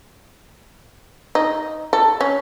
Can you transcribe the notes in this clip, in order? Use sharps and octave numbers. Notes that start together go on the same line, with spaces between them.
D#4
A4
C#4